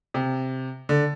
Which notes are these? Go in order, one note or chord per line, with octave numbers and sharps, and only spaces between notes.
C3
D3